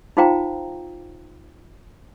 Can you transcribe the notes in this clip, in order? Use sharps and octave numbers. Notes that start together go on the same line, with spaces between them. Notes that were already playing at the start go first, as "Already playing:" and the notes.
D#4 F4 C5 F5 G5 A#5